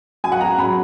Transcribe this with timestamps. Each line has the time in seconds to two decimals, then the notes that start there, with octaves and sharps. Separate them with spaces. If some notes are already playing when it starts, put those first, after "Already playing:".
0.24 F#3 G#5
0.32 F#5
0.41 E2 A#5
0.58 F#3 B5